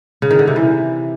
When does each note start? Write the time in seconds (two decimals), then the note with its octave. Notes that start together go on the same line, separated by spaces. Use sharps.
0.22 C#3
0.31 D#3
0.39 D3
0.47 C3
0.56 E3